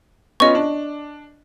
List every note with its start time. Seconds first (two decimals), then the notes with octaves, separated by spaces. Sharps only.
0.40 B3 C#4 F4 D#5 C#6
0.55 D4